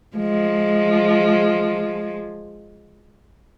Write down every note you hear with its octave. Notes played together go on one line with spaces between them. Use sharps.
F3 G#3